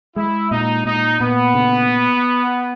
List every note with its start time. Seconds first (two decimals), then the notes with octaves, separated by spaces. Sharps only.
0.16 G#3 E4
0.51 A#2 D#4
0.85 A#2 D#4
1.20 A#2 B3
1.54 C#3